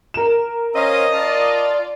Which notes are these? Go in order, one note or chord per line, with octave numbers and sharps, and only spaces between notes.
A#4 E7
C#4 C5 D#5 F5
F4 D5 A5 F6